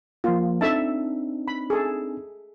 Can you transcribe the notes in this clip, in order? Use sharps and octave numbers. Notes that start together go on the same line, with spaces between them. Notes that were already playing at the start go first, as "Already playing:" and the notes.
F3 A#3 F4
C4 D4 D#4 A4 E5 A5
B5
G#4 A4